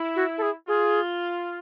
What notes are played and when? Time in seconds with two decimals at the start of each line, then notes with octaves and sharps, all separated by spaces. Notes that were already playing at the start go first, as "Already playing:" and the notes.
Already playing: E4
0.16 F#4
0.38 A4
0.42 G#4
0.68 F4 G#4